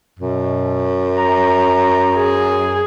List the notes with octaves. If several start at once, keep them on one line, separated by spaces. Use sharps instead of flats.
F#2 B2
A#5
G#4